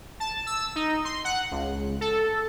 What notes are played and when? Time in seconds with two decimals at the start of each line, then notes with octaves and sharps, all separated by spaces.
0.20 A5
0.46 E6
0.76 D#4
1.05 C6
1.25 F#5
1.51 C#2
2.01 A4